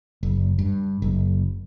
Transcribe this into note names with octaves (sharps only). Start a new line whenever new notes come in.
F#1
G2
F#1